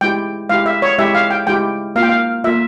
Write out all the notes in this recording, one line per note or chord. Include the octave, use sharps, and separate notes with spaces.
G#3 E4 G4 G5
G#3 E4 G4 F5
E5
C#5
G#3 E4 G4 E5
F5
G5
G#3 E4 G4 G5
A#3 F4 F5
G5
F5
A#3 F4 E5